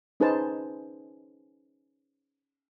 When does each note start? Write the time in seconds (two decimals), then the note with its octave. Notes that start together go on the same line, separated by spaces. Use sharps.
0.20 C#4 D#4 G#4 B4 C5 A5